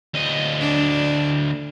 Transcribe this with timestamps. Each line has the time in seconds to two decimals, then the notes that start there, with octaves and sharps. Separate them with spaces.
0.14 D2 D#5
0.60 D4